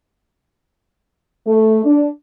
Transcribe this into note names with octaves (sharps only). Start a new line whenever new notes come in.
A3
D4